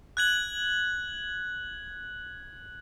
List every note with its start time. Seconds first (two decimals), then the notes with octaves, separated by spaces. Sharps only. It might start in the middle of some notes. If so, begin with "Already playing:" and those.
0.17 F#6 G#6 F#7